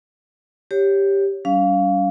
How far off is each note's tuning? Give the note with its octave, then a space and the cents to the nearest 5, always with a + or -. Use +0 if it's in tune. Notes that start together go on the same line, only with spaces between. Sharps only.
G4 +5 C#5 +0
G3 -25 C#4 +40 F5 +0